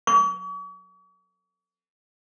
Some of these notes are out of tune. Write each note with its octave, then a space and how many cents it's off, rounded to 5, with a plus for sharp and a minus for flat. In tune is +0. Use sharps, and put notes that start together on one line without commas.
C#6 +45